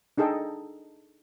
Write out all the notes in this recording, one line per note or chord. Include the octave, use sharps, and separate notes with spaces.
D4 D#4 G#4 A4 D#5 G5